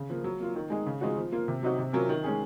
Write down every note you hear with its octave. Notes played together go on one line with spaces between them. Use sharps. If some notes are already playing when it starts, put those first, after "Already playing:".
Already playing: C#3
F3 A#3
F#3
A#3 F4
D#3
G#3 D#4 G#4
C#3
F3 G#3 D#4 F#4
F3
A#3 F4
C3
F#3 C4 D#4 F#4
C3
F#3 C#4 F4 A#4
D#3
G#3 C#4 G#4